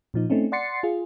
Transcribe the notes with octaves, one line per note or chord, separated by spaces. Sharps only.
A#2 F3 D#4
A3 C4 C#4 D#4
D5 F#5 C6 A6 C7 C#7
F4 G#4